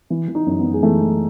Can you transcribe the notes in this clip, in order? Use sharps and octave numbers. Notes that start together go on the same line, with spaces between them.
E3
E3
D#4
F#2
B3
F#2
G#3
E3 A3
E3